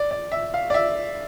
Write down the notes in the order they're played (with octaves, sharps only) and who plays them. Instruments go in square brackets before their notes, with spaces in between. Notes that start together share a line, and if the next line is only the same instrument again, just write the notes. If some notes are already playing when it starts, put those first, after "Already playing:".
Already playing: [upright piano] D5
D5
E5
F5
D5
E5